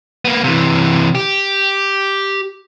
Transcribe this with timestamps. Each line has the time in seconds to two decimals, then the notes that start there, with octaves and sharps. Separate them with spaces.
0.25 A#3 B3
0.44 C3 E3
1.15 G4